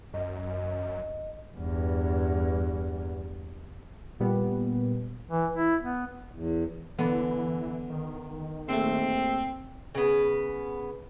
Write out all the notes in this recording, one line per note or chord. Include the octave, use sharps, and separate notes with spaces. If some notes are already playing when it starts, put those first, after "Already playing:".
F#2 D#5
E2 G2
A#2 G3 B3
E3
E4
B3
E2
D3 E3 B3
D#3
A#1 A3 C4
C#3 B3